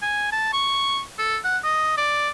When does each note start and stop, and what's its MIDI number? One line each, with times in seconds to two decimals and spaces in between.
0.02 0.28 80
0.32 0.49 81
0.53 1.01 85
1.18 1.37 69
1.44 1.58 78
1.63 1.93 75
1.97 2.29 74